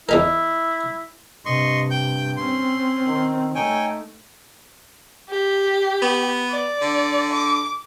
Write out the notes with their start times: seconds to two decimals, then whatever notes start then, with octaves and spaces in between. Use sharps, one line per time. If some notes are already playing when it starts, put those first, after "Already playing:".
0.09 E2 D#4 E4 A#4
1.45 G2 C3 D#5 C6 C#6
1.91 G5 G6
2.37 C4 C#4 C6
3.06 D#3
3.55 A3 D#4 C#5 G5 G#5
5.30 G4
6.02 B3
6.51 D5
6.82 D3
7.33 D6